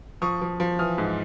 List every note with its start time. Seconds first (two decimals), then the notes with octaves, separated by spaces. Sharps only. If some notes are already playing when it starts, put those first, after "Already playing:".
0.22 F3 C#6 D#6
0.42 F3
0.60 F3
0.79 E3 D#6 F6
0.98 G#2